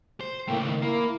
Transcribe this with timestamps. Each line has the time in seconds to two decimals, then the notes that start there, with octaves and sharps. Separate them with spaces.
0.21 C5
0.48 A2 C#3 A3 A#3 G5
0.63 D#3
0.82 A#3 E4 A#4